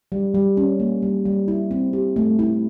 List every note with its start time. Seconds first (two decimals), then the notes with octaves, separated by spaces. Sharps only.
0.12 G3
0.34 G3
0.57 C#4
0.80 A#3
1.03 G3
1.25 G3
1.48 E4
1.71 C4
1.93 G4
2.16 A3
2.39 E4